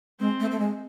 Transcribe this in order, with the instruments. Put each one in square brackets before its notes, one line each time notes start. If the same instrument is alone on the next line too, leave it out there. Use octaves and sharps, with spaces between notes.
[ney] G#3 [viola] C4
[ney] A3
A3
G#3